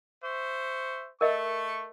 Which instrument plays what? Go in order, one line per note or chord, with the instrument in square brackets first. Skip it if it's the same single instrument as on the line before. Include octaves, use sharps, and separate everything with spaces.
[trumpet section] C5 E5 C#6
[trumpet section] A3 C#6 [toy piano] A#4 D#5 E5